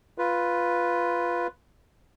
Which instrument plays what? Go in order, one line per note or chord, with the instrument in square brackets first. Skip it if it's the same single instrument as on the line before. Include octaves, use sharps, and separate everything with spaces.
[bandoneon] F4 B4